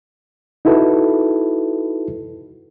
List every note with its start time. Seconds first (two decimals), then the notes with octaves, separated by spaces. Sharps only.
0.65 D#4 E4 F#4 A4 B4